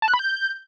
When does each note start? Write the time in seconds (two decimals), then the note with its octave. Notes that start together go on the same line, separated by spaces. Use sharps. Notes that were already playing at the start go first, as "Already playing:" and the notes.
0.02 A5
0.08 F#6
0.14 B5
0.19 G6